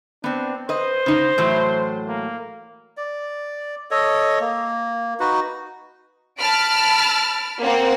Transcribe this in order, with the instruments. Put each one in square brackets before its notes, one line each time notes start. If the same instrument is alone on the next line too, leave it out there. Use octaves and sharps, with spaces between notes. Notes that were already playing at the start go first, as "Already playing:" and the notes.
[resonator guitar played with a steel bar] B3 C4 [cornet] D4
[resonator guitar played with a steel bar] B4 D#5 [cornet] C5
[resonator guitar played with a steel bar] C#3 D#4
A2 E3 F#3
[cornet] A#3
[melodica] D5
A4 C#5 D#5
A#3
D#4 F#4 B4
[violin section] A5 B5 F6 D7
A#3 C4 F#5